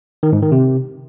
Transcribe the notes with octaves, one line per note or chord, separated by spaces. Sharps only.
D#3
G#2
D#3
C3